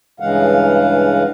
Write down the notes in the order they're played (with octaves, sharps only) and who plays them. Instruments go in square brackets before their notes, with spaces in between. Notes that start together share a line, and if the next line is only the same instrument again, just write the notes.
[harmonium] G2 C#3 E3 G#3 F5 F#5